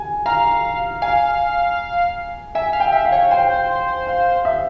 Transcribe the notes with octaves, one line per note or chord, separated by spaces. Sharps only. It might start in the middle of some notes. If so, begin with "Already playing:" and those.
Already playing: G#5
F5 A#5
F5 G#5
E5 G#5
F5
G5
E5
F5
C#5
C5 G5
F5
E5